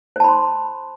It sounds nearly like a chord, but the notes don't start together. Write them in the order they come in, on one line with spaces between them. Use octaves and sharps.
C5 A5 B5 C6